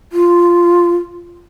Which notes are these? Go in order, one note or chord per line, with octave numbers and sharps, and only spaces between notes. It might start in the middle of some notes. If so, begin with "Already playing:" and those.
F4